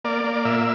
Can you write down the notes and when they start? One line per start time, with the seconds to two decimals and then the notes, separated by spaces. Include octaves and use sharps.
0.04 A#3 D5
0.24 A#3
0.34 D5
0.45 A#2 E5